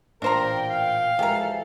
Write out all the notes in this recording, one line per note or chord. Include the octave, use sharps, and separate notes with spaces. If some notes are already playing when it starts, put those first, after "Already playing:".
A1 A#2 D4 A#4 C5 G5 A#5
F5
E3 F3 G#3 G4 A4 A#4